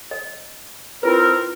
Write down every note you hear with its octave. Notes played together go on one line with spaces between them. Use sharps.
D#5
C4 E4 F4 A#4 B4